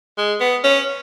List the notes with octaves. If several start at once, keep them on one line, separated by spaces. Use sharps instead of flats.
G#3
B3
C#4